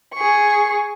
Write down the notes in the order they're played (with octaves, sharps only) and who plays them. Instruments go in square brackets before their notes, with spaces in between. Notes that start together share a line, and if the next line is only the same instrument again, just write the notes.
[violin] G#4 C#6